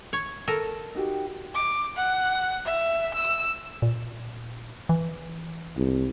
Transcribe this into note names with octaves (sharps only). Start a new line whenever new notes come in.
C#5
A4 A#4
D#4 F#4 G4
D6
F#5
E5
E6
A#2
E3
C2